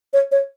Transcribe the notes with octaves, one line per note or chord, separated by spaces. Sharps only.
C#5
C#5